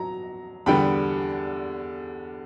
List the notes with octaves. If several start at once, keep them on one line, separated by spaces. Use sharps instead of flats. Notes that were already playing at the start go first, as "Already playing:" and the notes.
Already playing: F#3 A#5
E2 D3 G3 B3 G5 B5